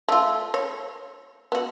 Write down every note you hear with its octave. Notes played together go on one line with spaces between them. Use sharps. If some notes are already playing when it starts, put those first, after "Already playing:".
A3 F4
C#5
B3 F#4